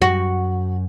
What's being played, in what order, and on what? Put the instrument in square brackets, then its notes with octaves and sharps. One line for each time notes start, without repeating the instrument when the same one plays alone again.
[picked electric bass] F#2 [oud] F#4